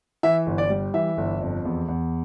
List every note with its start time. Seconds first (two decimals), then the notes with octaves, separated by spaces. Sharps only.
0.23 E3 E5
0.47 G1
0.58 D5
0.70 G3
0.94 E3 E5
1.18 G1
1.41 F2
1.65 E2
1.88 E2